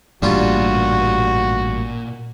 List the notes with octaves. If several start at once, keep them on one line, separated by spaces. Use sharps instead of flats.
A1 G2 A#2 G3 C#4 F4 F#4